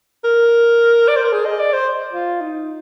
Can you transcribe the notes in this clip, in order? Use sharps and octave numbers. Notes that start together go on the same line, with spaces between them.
A#4
D5
C5
A#4
G#4
D#5
D5
C5
F4
D#4